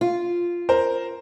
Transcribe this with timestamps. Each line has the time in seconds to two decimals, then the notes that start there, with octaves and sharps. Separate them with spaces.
0.01 F4
0.69 A#4 C5